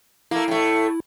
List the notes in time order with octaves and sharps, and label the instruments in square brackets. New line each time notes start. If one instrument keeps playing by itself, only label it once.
[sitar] A3 A#3 [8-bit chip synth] E4
[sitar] A2 A3